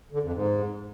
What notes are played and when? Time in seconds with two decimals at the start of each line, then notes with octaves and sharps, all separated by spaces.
0.12 D3
0.23 F2
0.33 G#2